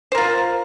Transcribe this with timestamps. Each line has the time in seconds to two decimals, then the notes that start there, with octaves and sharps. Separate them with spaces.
0.12 C5
0.15 A#4
0.18 F4